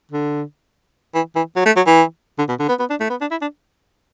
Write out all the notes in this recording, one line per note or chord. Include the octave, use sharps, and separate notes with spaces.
D3
E3
E3
F#3
A3
F#3
E3
D3
B2
D3
B3
B3
D4
A3
B3
D4
E4
D4